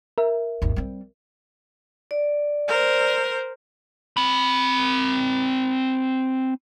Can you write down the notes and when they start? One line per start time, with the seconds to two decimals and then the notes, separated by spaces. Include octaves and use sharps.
0.18 A#4 E5
0.62 G#1 D#2
0.76 G3 C4
2.11 D5
2.68 A#4 C5
4.17 C4 B5